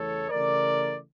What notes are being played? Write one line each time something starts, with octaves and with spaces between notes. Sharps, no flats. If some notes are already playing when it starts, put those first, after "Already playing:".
Already playing: E2 C#3 E3 A3 A4 C#5
C#3 E3 A3 A#4 D5